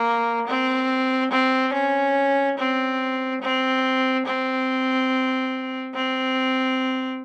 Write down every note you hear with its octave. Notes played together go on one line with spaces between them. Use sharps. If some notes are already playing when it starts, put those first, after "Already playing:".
Already playing: A#3
C4
C4
C#4
C4
C4
C4
C4